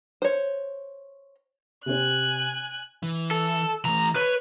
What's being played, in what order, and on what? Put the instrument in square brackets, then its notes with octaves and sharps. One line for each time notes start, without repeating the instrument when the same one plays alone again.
[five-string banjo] C5 C#5
[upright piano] C3 C4 [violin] G#5 F#6
[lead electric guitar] E3
[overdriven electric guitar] A4
[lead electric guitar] E3 A3 [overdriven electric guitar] A#5
[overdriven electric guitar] B4 [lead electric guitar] C#5